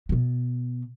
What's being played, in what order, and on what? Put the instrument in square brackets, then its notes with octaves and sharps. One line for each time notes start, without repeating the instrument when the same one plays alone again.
[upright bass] B2 B3